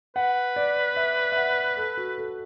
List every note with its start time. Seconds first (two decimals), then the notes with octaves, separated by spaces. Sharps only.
0.16 B4 F#5
0.56 D5
0.96 E5
1.32 E5
1.37 F#5
1.77 A4
1.97 F#4
2.18 A4